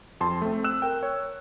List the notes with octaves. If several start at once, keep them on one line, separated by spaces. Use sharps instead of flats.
F2 A5 C6
A3 C4
E6 F#6 E7
A#4 G5
C#5